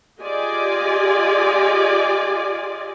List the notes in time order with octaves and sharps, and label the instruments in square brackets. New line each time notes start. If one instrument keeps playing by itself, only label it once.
[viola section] F4 G4 G#4 D5 D#5 G#5